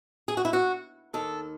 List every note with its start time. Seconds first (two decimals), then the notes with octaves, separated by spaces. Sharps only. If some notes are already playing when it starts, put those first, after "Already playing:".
0.28 G#4
0.37 F#4
0.45 E4
0.53 F#4
1.13 D#2 D#3 A4